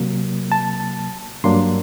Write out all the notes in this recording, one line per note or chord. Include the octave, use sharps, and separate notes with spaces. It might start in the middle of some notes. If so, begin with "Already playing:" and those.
Already playing: C3 F#3 A#3
A5
G2 F#3 A#3 D4 C6